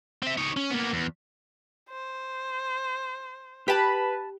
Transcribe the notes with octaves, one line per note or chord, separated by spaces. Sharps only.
C4 E5
D#4 C#5
C#4
A#3 B3
E2
C5
G4 B4 G5 A5 B5